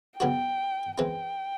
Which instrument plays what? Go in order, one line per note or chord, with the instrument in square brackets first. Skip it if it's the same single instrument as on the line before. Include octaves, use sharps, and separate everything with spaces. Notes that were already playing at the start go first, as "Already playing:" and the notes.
[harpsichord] C#3 F#3 B3 D4 F#4 [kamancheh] G5
[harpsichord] E3 G#3 C4 D#4 [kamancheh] G5